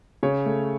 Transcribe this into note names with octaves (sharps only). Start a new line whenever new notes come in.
C#3 C#5
A3